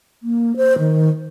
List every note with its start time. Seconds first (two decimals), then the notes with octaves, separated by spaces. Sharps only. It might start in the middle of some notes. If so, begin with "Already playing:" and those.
0.23 A#3
0.57 C5
0.79 D#3